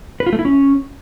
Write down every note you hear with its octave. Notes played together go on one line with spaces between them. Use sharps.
B4
F4
A3
E4
C#4